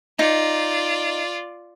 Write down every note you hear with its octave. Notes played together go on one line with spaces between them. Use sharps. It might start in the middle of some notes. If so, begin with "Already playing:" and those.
D#4 F4 D5